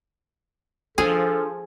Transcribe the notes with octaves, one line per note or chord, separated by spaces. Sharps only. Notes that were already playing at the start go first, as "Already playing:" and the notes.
F3 D4 G#4 A4